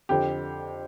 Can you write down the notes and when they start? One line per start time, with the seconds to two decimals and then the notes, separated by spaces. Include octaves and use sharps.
0.09 F2 D3 G4